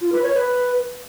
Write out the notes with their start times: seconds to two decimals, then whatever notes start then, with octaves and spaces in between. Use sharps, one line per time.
0.01 F4
0.12 B4
0.23 C#5
0.34 B4